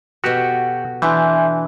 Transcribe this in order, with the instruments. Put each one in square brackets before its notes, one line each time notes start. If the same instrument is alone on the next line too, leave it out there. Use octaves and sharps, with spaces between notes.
[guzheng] B2 B3 A4 [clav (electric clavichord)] F#4 G4
[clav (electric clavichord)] E3 [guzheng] D4 [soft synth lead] E5 [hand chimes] G#5 C6 G6